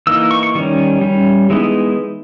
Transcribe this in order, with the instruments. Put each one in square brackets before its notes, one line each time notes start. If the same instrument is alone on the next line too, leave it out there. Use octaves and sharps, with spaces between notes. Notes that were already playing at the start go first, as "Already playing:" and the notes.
[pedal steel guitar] E3 A#3 D#4 E6
C#6
C#6
D#3 G3 C#4
G3 C#4
E3 G#3 B3 D#4